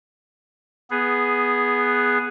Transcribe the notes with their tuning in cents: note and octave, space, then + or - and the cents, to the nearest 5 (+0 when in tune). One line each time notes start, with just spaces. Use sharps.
B3 +0 G#4 +0